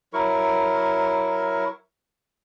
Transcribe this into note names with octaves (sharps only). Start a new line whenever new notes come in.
F#3 E4 A#4 C#6